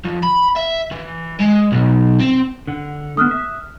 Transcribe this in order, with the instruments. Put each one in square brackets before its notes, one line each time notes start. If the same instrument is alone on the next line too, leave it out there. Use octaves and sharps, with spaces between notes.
[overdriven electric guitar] F2
B5
E5
E3
G#3
B1
C4
[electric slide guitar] D3 F#5
[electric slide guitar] A3 B3 [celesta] D#6 F6 F#6
[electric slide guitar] E5